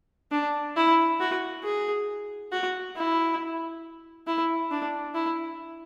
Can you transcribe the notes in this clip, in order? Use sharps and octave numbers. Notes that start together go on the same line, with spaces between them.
D4
E4
F#4
G#4
F#4
E4
E4
D4
E4